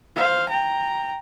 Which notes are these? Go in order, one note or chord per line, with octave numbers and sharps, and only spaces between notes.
C5 F5
G5 A#5